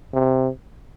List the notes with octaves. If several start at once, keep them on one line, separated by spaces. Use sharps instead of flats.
C3